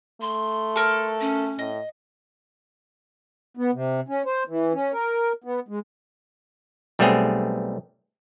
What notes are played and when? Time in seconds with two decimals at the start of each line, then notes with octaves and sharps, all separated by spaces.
0.21 A3 C6
0.76 A4 A#4 C#5
1.20 C#4
1.59 A2 D#5
3.57 B3
3.73 C3
4.08 C#4
4.26 C5
4.48 E3
4.73 C#4
4.93 A#4
5.44 B3
5.68 G#3
6.99 B1 G3 A3 B3 C4 G#4